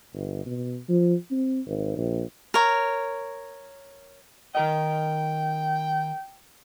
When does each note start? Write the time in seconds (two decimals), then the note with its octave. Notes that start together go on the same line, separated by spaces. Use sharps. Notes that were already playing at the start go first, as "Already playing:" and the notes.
0.14 G1
0.46 B2
0.89 F3
1.31 C4
1.66 G#1
1.97 A#1
2.54 A#4 C#5
4.55 D#3 A#4 D#5 G5